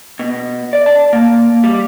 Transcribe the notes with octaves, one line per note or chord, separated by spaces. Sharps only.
B2
D5
A5
A#3
G3